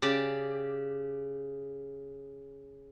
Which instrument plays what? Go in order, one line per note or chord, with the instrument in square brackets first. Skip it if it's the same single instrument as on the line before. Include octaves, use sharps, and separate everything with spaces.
[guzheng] C#3 G4 D5